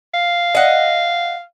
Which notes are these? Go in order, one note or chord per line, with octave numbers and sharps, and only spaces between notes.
F5
D#5 F#5